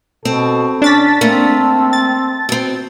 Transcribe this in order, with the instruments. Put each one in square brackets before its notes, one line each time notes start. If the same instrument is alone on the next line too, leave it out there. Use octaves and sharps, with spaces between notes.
[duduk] B2 [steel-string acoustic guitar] C4 [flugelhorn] A4
[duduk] C#4 [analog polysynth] D4 A6 B6 [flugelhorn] A5
[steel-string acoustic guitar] A3 A#3 [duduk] C4
[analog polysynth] A6
[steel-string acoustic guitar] B2 C4